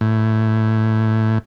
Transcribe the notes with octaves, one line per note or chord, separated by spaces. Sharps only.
A2